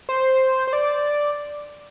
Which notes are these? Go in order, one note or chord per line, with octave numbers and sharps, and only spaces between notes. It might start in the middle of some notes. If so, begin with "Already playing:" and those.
C5
C5
D5